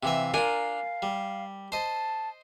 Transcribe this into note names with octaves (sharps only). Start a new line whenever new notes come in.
C3 E3 E5 F5
D4 F4 A#4 G#5
G3
C5 D#5 A5